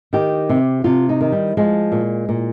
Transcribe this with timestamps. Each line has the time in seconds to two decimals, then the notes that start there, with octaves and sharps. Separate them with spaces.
0.13 D#3 G4
0.49 C3
0.84 C3 F4
1.09 D#4
1.21 D#3
1.32 G3
1.57 F3 G#3
1.92 A#2
2.29 A#2